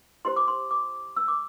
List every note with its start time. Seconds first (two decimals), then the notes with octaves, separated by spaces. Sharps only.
0.25 E4 G4 C5 C6
0.36 D6
0.48 C6
0.71 D6
1.16 E6
1.28 D6